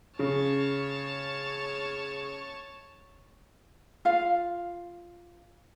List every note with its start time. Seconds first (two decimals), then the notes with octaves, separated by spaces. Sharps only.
0.19 C#3 C#5 A5
4.05 F4 F5